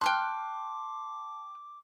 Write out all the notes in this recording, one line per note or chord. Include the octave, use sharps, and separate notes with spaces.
G5 A5 C6 D6 F6 F#6